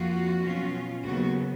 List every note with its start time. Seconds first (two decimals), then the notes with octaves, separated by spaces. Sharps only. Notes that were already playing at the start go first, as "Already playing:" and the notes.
Already playing: F2 F3 A#3 F4 F#4
0.42 B2 F#3 C#4 F4
1.03 D#2 C#3 F#3 B3 F#4